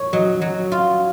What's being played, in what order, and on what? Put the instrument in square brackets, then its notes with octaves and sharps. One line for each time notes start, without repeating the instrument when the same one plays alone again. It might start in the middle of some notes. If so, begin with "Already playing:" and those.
Already playing: [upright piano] C#5
[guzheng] F#3 [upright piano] D#5
[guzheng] F#3
F4